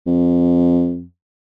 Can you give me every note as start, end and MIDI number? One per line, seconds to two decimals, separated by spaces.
0.07 1.04 41